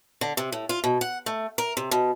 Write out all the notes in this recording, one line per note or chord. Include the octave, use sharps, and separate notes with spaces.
D3
C3
A2
F4
B2
F#5
A3
A#4
C3
B2